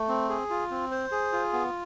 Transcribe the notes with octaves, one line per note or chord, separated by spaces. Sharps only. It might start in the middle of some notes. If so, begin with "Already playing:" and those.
Already playing: A3
C4
G#4
F4
C4
C5
G#4
F4
B3